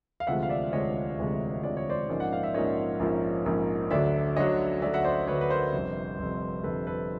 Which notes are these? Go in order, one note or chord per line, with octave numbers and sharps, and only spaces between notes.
F5
E1 D2 C3 F3 G#3 E5 F#5
F5
D5 E5
E1 D2 C3 F3 G#3 C#5 D#5
E1 D2 C3 F3 G#3
E1 D2 C3 F3 G#3 D5
C#5
C5 D5
A#1 G#2 F3 A#3 C#4
F#5
F5
E5
A#1 G#2 F3 A#3 C#4 C#5 D#5
A#1 G#2 F3 A#3 C#4
A#1 G#2 F3 A#3 C#4
D2 D3 F#3 D5 E5
D2 D3 F#3 C#5 D#5
D2 D3 F#3 D5 E5
E5 F#5
C5 D5
D2 D3 F#3 B4 C#5
B4
A#4 C5
G1 F2 C3
G1 F2 C3
G1 F2 C3 A4 B4
A4 B4